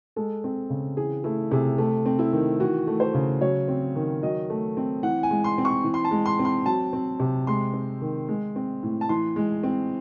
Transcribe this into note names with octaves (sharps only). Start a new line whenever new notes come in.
G#3 A4
C4
C#3
E3 G#4
A3 E4
C3 G#4
A3 A4
C4
E4
D#3
E3 F#4
A3
C5
C#3
F#3 C#5
C4
D#3
F#3 D#5
A3
C4
E3 F#5
G#5
G#3
C6
C4
C#6
E3
C6
A5
G#3
C6
C4
C6
F#3 A5
C4
C3
G#3 C6
C4
D#3
G#3
C4
A2
A5
E3 C6
G#3
C4